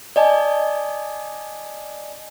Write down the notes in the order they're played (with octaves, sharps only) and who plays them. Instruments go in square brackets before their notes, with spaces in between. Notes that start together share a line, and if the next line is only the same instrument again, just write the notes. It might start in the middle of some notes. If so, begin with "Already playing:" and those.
[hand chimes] D5 D#5 G#5 A5